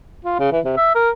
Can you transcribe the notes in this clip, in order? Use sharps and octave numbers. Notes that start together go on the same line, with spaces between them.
F4
C#3
E3
C3
E5
A#4